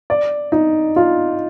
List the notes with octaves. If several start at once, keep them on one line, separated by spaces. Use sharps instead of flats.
D5
D#4
F4